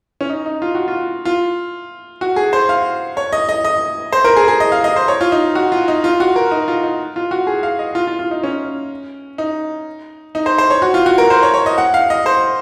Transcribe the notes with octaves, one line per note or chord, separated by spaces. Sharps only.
C#4
D#4
D#4
F4
F#4
F4
F4
F#4
G#4
C5
F5
C#5
D#5
D#5
D#5
C5
A#4
G#4
G#4
D#5
F5
D#5
C5
C#5
F4
D#4
F#4
F4
D#4
F4
F#4
A#4
D#4
F4
D#4
F4
F#4
G#4
F5
D#5
F4
F4
F4
D#4
C#4
D#4
D#4
C5
C5
C#5
F#4
F4
F#4
A#4
C5
C#5
C#5
D#5
F#5
F5
D#5
C5